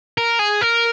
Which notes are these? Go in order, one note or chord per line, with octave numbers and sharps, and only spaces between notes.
A#4
G#4
A#4